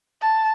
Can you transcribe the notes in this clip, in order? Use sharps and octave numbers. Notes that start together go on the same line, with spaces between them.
A5